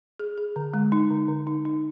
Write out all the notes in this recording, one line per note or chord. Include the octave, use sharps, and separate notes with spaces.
G#4
G#4
D3
G#3
D#4
D3
D3
D#4
D#4